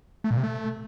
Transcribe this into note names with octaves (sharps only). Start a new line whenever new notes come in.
A3
A#2
C3
A3